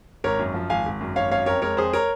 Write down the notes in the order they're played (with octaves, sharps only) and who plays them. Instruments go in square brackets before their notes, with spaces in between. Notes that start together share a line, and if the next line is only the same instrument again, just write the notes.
[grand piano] G#1 A#4 C#5
F#2
F3
G#1 F5 G#5
G#1
F#2
G#1 C#5 F5
F#2 C#5 F5
F2 A#4 C#5
G#3 A#4 C#5
F2 G#4 C5
A#4 C#5